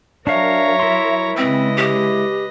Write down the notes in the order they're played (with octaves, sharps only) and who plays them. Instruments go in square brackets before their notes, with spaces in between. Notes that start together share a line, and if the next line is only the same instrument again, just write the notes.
[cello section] F#3 A#4 [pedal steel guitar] D4 F5 [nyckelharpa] C#5 A#5 [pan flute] E5
[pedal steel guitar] E4 C6
[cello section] C#3 G#3 [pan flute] C4 [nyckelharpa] B4 D#5
[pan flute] G4